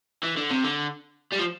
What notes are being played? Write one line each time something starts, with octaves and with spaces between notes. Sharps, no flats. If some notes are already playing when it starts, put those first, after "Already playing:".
E3
D3
C3
D3
G3
F3